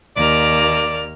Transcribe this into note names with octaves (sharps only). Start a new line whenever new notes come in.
D#2 A#3 D5 F6